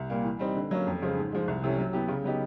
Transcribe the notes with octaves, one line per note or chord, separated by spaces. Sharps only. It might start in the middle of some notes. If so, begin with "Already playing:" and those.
Already playing: C2
A#2 G3 A#3
E3
G3 C4 D#4
D3
F#3 A#3 C#4
F2
C#3 F3 G#3
G#2
F3 G#3
C2
C3 E3 A3 C#4
F#3
B3 E4 G4
C#3
F#3 B3 D#4 G4